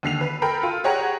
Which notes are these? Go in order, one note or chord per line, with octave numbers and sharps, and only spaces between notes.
D#2 D3 C7 F7
B4
A4 A#4 G5 A#5 B5
F4 A4
G4 G#4 C#5 F#5 G5 A#5